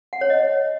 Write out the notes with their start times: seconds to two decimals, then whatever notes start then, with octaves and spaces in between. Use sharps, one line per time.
0.13 F#5
0.21 C#5
0.30 D#5